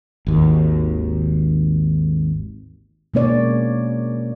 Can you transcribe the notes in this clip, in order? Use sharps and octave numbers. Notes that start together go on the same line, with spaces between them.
G#1 D#2
B2 G#3 A#3 C#4 C#5 D5